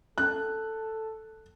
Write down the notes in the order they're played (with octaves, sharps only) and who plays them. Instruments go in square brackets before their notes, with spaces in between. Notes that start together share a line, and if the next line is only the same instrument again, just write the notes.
[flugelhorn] A4 [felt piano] F#6